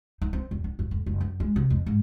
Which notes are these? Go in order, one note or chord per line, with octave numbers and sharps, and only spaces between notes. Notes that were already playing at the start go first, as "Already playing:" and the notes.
D#4
C4
E2
D4
G2
D#1
F#1
F#2
G#3
C3
F2
G#2